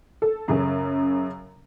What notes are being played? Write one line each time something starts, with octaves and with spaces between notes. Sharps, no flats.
A4
F#2 C#3 C#4